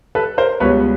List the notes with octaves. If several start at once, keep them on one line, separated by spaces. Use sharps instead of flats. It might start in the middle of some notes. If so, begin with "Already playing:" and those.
A4 B4
A#4 C5
C#2 B2 G3 B3 B4 C#5